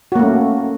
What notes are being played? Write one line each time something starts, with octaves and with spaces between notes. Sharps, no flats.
A3 A#3 C#4 F#4